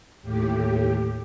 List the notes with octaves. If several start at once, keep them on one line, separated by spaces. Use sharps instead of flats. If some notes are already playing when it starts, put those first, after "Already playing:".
D#2 A2 G4